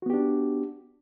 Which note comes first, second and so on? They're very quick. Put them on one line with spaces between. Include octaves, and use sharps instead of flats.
F#4 B3 G4 D4